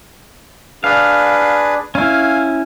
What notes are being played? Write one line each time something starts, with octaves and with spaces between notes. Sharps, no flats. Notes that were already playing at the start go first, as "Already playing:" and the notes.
D4 G#4 B4 F5
C#4 E4 F5 G#5